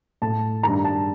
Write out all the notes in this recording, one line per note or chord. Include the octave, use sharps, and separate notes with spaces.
A2 A5
G2 D#3 A#5
A5